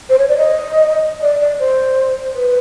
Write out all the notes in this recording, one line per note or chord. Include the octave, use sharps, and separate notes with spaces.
C5
C#5
D5
D#5
D5
D5
C5
B4